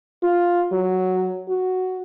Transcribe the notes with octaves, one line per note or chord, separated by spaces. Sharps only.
F4
F#3
F#4